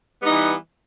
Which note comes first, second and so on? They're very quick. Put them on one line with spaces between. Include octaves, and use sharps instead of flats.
B3 G3 D#4 E3